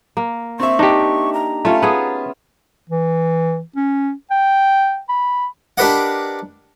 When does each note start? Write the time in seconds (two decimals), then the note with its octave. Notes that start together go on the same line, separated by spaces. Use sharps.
0.17 A#3
0.60 C4 E5 C#6
0.79 D4 D#4 G4
1.33 A#5
1.65 A3 C#4 F4 E5
1.82 B3 G#4
2.90 E3
3.76 C#4
4.31 G5
5.09 B5
5.78 D4 G4 A#4 B4 D#5 F#5